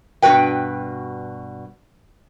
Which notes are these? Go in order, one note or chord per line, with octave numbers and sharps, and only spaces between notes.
G2 B2 F#4 B4 G5